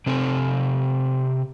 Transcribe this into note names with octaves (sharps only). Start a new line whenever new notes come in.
C3 C4 A4